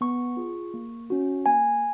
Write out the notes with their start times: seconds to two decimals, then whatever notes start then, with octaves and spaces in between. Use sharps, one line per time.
0.01 B3 C#6
0.37 F4 G#4
0.74 A#3
1.10 C#4 F#4
1.46 A#3 G#5